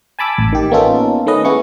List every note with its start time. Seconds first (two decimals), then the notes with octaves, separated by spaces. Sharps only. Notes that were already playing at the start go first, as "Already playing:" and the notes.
0.19 G#5 A5 B5 D6 E6
0.38 A1
0.52 D#3 G4
0.71 A#3 B3 C#4 D#4 F4 A4
1.26 D#3 A3 C#4 B4 D#5
1.45 B3 E4 G#4 C#6